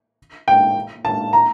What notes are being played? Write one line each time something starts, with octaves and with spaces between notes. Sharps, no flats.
G5
A5
A#5